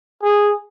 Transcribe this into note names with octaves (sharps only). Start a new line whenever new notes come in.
G#4